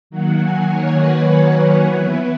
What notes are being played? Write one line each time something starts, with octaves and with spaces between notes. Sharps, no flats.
D#3 F#3 A#3 F#5
G#5
C#5
B4
E3 B3 E4